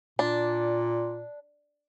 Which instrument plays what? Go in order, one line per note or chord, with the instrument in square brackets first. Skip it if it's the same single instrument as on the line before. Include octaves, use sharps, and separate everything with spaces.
[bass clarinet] A#2 [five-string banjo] D4